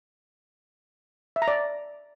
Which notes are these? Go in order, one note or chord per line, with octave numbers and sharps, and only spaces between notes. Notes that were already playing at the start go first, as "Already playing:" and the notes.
E5
A#5
D5